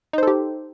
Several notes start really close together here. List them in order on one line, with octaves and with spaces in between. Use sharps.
D#4 C5 A4 G4